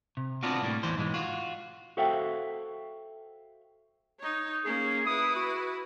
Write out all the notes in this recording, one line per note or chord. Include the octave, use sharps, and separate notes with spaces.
C3
B3 C4 D4 F4 F#4
A2 G3 A#3
E2 E3 C5
B1 G#2 E3 G#3
F4 F#4
F#4 A4 C5 E5 F5 G5
D#4 C#5
A#3 C#4 G#4
E4 B4 D#6
F#4